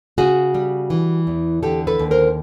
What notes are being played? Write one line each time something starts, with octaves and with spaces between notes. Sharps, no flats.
C#3 F#4 G#4
G3
E3
E2
D3 G4 A4
A4 B4
D#2
A#4 C5